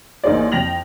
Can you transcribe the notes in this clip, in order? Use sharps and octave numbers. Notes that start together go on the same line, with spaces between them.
A1 A#3 D#4 G#4 C5 D5
F2 G5 A#6 F7 F#7